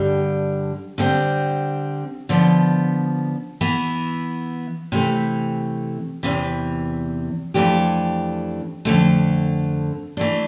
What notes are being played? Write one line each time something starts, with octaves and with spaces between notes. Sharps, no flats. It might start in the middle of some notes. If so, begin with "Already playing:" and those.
Already playing: G2 D3 G3
D3 G3 C4
D3 F3 B3
E3 B3 E4
C3 E3 A3
E2 C3 E3
F2 E3 A3 D4 G4
F2 D3 A3
E3 A3 D4